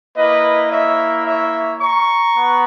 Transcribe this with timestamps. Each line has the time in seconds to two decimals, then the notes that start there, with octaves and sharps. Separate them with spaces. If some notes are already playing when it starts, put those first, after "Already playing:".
0.15 A#3 E4 B4 D#5
0.71 C#5 E5
1.26 C#5 E5
1.80 A#5 C#6
2.36 B3